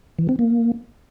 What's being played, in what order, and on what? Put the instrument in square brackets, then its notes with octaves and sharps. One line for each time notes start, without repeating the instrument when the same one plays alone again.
[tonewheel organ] E3
C4
A#3